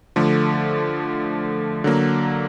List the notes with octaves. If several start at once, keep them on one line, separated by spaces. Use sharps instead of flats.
D3 F3 A3
D3 F#3 A#3